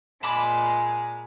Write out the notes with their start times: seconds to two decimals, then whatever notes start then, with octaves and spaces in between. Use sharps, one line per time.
0.23 A#2 G#3 A5 B5 D6